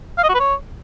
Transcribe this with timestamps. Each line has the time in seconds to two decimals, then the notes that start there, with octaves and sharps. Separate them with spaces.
0.18 F5
0.23 D#5
0.29 F#4
0.34 B4
0.40 C#5